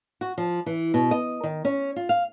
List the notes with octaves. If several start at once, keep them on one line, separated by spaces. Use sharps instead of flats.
F#4
F3
E3
B2
D#5
D#3
C#4
F4
F5